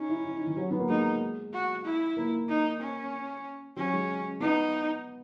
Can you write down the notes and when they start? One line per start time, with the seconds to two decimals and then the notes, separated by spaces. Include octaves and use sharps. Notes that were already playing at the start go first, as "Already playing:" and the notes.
Already playing: C#4 D#4
0.09 E4
0.25 E4
0.36 D#4
0.47 E3
0.57 F#3
0.71 B3
0.80 A#3
0.89 G#3 D#4
1.53 F#4
1.85 E4
2.17 A#3
2.49 D#4
2.81 C#4
3.76 F#3 C#4
3.92 G#3
4.40 B3 D#4